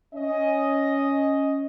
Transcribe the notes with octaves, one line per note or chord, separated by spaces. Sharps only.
C#4 D#5